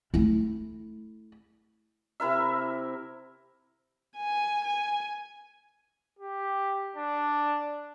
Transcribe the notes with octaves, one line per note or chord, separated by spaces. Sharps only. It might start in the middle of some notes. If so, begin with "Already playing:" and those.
A3 E4
C3 E4 A#4 E5
G#5
G#5
G4
D4